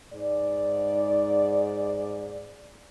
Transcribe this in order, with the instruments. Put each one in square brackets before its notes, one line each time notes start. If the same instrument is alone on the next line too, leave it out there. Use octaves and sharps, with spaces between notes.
[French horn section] G#2 D5